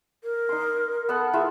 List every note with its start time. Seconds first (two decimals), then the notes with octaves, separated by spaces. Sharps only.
0.24 A#4
0.49 D#4 C6
1.09 B3 A4 F#5
1.33 E4 F4 G#4 E5